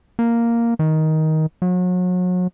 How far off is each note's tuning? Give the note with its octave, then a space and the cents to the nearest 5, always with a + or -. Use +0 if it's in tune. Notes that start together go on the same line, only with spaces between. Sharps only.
A#3 +0
D#3 +15
F#3 -35